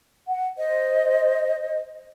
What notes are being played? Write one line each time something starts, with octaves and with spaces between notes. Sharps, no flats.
F#5
C5 D#5